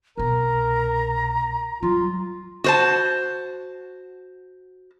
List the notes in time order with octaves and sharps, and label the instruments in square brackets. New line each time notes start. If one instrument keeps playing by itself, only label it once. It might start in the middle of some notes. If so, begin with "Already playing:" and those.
[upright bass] C2 B2 [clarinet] A#4 [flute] A#5
[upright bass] F#3 G3 [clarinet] F4
[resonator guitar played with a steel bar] F#4 C5 A5